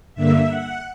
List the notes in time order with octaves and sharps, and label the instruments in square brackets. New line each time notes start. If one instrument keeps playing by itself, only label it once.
[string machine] G2 D3 A#3 E5
F#5